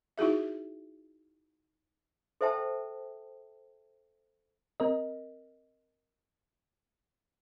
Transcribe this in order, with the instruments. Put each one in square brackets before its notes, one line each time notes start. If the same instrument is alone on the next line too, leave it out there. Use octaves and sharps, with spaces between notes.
[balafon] D#4 E4 F#4 G#4 E5
[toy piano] A4 C5 E5 G5 A5
[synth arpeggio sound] C4 A#4 D#5